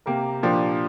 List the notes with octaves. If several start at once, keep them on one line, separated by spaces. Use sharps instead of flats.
C3 A#3 G4 A#4
A#2 F3 A#3 D4 G4